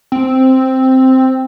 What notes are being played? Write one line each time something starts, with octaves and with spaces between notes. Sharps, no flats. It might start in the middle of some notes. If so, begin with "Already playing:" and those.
C4